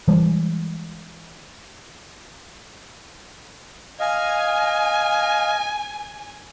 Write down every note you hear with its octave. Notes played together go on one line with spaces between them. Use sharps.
E3 G3 G#3
D#5 F5 G#5